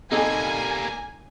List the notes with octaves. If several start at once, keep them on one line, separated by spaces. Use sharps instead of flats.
C3 G3 A#3 D#4 A4 G#5